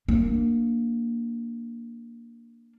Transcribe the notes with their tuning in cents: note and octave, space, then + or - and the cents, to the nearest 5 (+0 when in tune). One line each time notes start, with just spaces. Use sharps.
A#3 +0 D4 +5